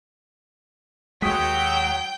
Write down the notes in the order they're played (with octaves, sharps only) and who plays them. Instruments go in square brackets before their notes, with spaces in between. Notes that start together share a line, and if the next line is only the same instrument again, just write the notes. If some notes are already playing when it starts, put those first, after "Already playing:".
[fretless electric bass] D#2 G#3 [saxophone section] F#3 [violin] G5 G6 [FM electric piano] D#6 B6